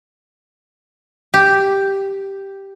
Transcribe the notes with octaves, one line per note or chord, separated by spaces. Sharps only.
G4